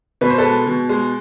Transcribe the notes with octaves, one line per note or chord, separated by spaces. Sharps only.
B2 B4
C5
A4 B4
G#3
B2
G#3